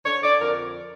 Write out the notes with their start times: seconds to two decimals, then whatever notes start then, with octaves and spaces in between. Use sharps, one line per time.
0.05 D3 C#5
0.22 D3 D5
0.39 F2 A#4